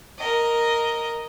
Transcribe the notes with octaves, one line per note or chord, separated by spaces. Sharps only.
A#4 D#5